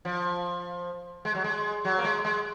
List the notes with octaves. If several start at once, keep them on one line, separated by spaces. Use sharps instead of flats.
F3
G#3
F#3
G#3
F#3
A#3
G#3
G#3